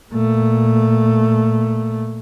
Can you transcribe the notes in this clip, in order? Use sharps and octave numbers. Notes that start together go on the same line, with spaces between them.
A#2 A3